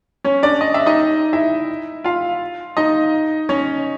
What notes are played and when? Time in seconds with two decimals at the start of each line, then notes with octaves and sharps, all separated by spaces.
0.24 C#4 C#5
0.43 D4 D5
0.61 D#5
0.74 E5
0.86 D#4 D#5
1.33 E4 E5
2.04 F4 F5
2.77 D#4 D#5
3.49 C#4 C#5